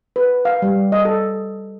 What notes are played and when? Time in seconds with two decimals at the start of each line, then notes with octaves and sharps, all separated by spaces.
0.16 B4
0.45 F5
0.62 G3
0.92 D#5
1.05 A4